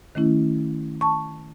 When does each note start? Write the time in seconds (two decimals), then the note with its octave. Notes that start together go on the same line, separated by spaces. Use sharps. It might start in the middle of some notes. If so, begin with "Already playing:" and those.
0.15 D#3 A3 C#4 E4
1.01 A5 C#6